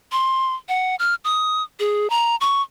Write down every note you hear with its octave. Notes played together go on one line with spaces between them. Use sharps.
C6
F#5
F6
D#6
G#4
A#5
C#6